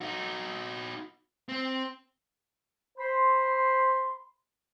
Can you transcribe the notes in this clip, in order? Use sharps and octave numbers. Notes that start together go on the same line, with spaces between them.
D#4 F#4
C4
C5 B5 C6